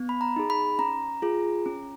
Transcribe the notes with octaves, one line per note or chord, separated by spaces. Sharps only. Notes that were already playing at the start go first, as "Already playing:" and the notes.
Already playing: B3
B5
A#5
D#4 G#4
B5
C#4 A#5
F4 G#4
C#4